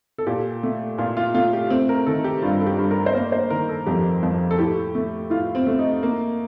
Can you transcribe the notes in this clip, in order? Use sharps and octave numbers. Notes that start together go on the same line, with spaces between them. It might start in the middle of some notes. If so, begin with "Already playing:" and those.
A4
A#2 G4
A3
A#2 F4
F4
A3 F4
G4
A3 C4
A#4
D#3 A4
G4
G2 F4
A4
G4
G2
A#4
C5
A#3 A#4
C5
D#3 A#4
A4
F2 G4
F2
A4
A2 G4
A3
A2 F4
C4
A3
D#4
A#3